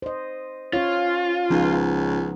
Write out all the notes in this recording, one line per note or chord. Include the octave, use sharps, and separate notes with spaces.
C5 D#5
C#4 F4 C#5
C#2 F3 B3 D#4